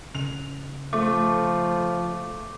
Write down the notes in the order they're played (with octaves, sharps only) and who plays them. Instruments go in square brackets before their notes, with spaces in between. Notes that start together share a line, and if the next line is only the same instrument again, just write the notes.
[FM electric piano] C#3 [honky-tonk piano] F7
[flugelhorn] F3 [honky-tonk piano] A3 [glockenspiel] D6